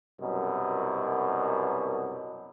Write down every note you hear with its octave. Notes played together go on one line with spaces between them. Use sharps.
C2 F#2 B2